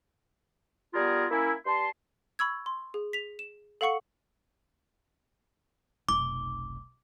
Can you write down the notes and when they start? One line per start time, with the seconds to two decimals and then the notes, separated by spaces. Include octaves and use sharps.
0.94 G3 B3 F4 G#4 A#4
1.30 A#3 C#4 E4
1.66 G2 A5 C6
2.39 B5 C#6 E6 G#6
2.66 C6
2.94 G#4
3.13 B6 F7
3.39 E7
3.81 A4 F5 F#5 C#6 C#7
6.09 F1 B1 D6